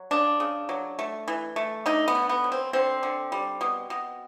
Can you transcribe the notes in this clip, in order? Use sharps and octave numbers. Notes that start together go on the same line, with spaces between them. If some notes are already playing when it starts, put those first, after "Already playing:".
Already playing: F#3
C#3 D4
C#3
F#3
A3
E3
A3
D3 D#4
B3
D3
B3
F#3
C4
D3 C4
D3
G3
B2
B2